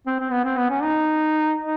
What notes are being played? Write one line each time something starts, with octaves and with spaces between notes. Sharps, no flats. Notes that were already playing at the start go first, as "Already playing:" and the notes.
C4
C4
B3
C4
B3
C#4
D#4
D#4